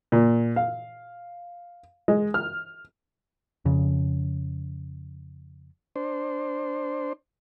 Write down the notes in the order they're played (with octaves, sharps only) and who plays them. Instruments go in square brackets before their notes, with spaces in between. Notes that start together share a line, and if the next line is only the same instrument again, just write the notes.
[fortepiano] A#2
F5
G#3
F6
[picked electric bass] F2 C#3
[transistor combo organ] D4 C5